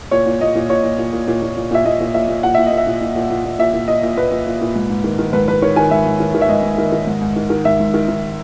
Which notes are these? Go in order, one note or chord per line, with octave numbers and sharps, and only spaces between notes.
A#2 C#5
A#2
A#2 D#5
A#2
A#2 C#5
A#2
A#2
A#2
A#2
A#2
A#2
A#2 E5
A#2 D#5
A#2
A#2 E5
A#2
A#2 F#5
A#2 E5
D#5
A#2
E5
A#2
A#2
A#2
A#2
A#2
A#2 E5
A#2
A#2 D#5
A#2
A#2 B4
A#2
A#2
A#2
G#2
G#2
D#3
D#3
G#2 B4
G#2 B4
D#3 C#5
D#3 G#5
G#2 E5
G#2
D#3
D#3
E5
G#2 D#5
G#2
D#3
D#3
G#2
G#2
D#3
D#3
G#2 E5
G#2
D#3
D#3